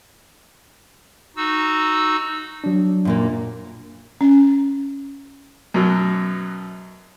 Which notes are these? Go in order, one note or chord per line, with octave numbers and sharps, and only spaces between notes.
D#4 F#4 E6
F#3 D4
F#2 A#2 A#3
C#4
F#2 B2 F#3